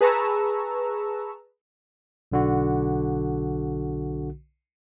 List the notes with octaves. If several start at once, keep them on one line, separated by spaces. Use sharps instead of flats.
G#4 B4 A5 A#5 C#6 E6
B1 D3 F#4